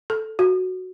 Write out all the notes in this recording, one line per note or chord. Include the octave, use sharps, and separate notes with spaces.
A4
F#4